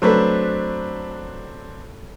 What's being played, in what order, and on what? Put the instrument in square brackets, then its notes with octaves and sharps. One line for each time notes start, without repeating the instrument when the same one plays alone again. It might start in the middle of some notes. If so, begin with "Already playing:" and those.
[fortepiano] F#3 A3 B4 [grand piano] C4 D4 C5